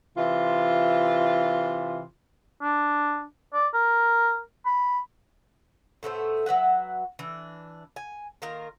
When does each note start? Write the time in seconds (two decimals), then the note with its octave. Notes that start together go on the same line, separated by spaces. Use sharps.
0.17 C3 E3 F4
2.62 D4
3.54 D5
3.74 A#4
4.66 B5
6.03 A2 A3 B3 C5
6.46 F#3 B4 E5 F#5
7.19 E3 D4
7.96 G#5
8.42 D#3 A#3 F4 A#4